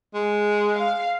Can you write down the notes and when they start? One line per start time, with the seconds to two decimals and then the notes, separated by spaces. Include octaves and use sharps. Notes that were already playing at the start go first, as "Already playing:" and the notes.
0.14 G#3
0.74 F5